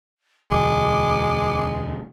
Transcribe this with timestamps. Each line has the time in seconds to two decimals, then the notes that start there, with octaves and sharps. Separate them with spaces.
0.51 E1 D2 G#3 D6